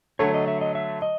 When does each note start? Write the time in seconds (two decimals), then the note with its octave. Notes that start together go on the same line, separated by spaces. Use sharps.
0.19 D3 F#3 A3 C#5
0.34 D#5
0.48 E5
0.61 D#5
0.75 E5
1.02 D#5